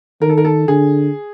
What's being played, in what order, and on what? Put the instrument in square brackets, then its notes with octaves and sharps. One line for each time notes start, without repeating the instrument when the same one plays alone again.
[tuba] D#3 [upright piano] A#4
[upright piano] A4
A#4
A4
[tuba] D3 [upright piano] G#4